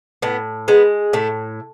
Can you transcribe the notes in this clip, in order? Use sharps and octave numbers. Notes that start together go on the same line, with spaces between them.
A2 B3
G#3 B3
A2 A3